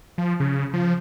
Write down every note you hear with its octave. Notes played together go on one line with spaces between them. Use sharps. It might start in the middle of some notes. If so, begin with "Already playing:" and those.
F3
C#3
F3